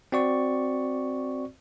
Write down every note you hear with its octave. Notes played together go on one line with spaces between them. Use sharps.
C4 F#4 D5 C#6